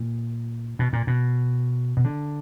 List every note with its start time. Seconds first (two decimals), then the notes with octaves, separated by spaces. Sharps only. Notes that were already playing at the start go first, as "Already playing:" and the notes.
Already playing: A#2
0.79 B2
0.93 A#2
1.07 B2
1.97 B2
2.04 D3